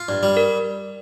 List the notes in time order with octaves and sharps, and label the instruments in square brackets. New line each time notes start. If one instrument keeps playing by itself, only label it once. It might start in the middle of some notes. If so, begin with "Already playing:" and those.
Already playing: [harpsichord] F4
G2
G3
[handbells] A#4